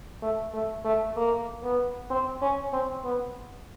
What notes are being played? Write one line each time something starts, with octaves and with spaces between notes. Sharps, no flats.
A3
A3
A3
A#3
B3
C4
C#4
C4
B3